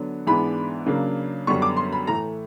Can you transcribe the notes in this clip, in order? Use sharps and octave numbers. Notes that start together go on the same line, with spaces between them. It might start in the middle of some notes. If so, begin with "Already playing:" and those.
Already playing: D3 F#3 B3 D4
G#2 E3 G#3 B3 D4 B5
C#3 F#3 A#3 D4
F#2 D3 G3 B3 C#6
D6
C6
B5
A2 E3 A3 A#5